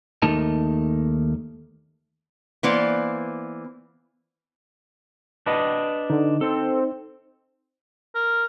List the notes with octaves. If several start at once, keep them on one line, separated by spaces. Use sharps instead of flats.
D#2 A3 D#4 A#4 A5
E3 A#3 B3 C5 D5
D4 B4 D#5
D3 D#4
C4 A4
A#4